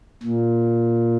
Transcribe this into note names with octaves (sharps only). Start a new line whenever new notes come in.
A#2